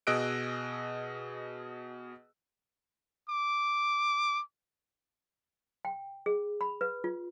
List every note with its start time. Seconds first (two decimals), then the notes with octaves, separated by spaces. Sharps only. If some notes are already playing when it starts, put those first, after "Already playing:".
0.07 B2 G#4 D#5 E6 F#6 D7
3.30 D6
5.85 G5
6.26 G#4
6.61 B5
6.81 B4
7.04 F4